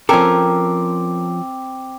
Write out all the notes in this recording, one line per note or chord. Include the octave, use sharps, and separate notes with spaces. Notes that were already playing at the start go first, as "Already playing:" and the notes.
F3 C4 C#4 A4 A#4 D6